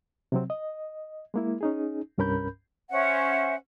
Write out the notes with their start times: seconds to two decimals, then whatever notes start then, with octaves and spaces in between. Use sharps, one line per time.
0.32 C3 F#3 C4
0.50 D#5
1.34 G#3 A#3 E4
1.61 C#4 D#4 G#4
2.18 C2 G2 C#4 A#4 B5 G6
2.90 C#4 C5 E5 F#5